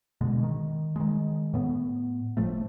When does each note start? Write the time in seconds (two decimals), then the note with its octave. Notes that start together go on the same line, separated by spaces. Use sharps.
0.21 B2 D3 G#3
0.43 D#3
0.96 D#3 G#3
1.54 A2 B3
2.37 G1 A2 F3 A3